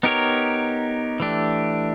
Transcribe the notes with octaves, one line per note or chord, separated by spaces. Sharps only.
B3 D#4 G4 A#4 C#5
E3 A3 D4 G4